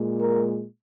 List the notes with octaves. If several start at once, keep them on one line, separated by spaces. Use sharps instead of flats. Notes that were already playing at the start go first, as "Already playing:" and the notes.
Already playing: A#2 G#3
A#4